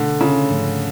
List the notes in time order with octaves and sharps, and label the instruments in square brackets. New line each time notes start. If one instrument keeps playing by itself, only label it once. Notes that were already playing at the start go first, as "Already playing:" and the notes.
Already playing: [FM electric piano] B2 A3 [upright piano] D3
[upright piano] C#3
[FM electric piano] G#2 F3 A3 C#4